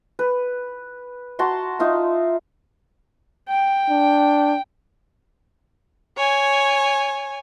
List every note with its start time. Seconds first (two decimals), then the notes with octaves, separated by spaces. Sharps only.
0.19 B4
1.39 F#4 A5 A#5 C6
1.79 D#4 F4 E5
3.49 G5
3.90 D4
6.17 C#5 G#5